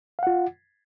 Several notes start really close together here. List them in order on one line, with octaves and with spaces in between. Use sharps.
F5 F#5 F4